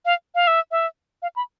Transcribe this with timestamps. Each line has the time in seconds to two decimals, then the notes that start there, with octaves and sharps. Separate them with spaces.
0.05 F5
0.35 F5
0.47 E5
0.71 E5
1.22 F5
1.36 B5